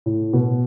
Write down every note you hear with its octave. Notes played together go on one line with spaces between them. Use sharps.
A2
B2